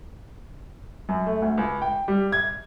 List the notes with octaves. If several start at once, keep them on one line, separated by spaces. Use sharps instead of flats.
F#2
A3
D2
C#2
G5
G3
G#6